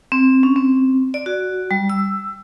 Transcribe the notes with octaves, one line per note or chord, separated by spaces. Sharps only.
C4
C#4
C4
D5
F#4
G3
E6